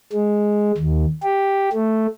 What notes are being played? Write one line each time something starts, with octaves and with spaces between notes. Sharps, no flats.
G#3
D#2
G4
A3